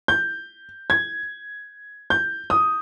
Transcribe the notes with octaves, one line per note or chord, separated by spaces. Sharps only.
G6
G#6
G6
D#6